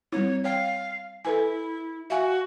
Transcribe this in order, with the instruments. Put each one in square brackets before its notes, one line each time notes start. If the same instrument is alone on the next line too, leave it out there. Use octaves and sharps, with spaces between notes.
[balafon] G3 C4 E4 [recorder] C#5
[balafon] C#5 G5 [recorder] F5
[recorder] E4 [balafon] A4 B4 G#5
[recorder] F#4 [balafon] E5 F5 G#5